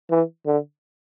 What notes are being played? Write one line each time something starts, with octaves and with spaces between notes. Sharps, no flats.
E3
D3